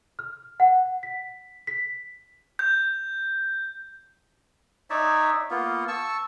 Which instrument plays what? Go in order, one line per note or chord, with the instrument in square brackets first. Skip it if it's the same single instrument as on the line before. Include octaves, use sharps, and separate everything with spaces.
[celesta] F6
F#5
B6
B6
[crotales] G6
[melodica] D#4 C#5 D5 E5
A#3 B3 F4
A5 C#6 E6